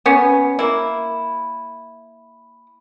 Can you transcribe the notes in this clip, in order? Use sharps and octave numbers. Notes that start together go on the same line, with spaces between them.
B3 C#4
A#3 E4